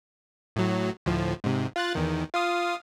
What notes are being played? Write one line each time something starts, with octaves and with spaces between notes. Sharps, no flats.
A2 F#3
D2 A2 F3
G#2 C3
F4 F#6 A6
E2 D#3
F4 F5 D#6